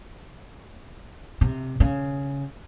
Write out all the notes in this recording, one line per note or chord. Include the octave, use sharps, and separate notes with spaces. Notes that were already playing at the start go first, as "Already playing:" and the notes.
C3
C#3